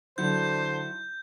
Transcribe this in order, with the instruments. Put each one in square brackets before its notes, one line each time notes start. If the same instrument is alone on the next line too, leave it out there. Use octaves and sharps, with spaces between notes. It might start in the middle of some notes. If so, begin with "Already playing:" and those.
[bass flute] D3 [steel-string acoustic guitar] F#3 E4 F#4 [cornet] C5 [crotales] G6